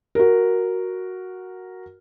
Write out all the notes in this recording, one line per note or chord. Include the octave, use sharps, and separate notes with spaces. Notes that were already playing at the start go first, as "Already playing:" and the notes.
F#4 A#4